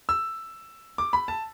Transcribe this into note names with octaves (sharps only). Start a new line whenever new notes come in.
E6
D6
B5
A5